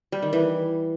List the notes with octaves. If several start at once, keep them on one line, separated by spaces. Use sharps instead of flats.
G3
D#3
E3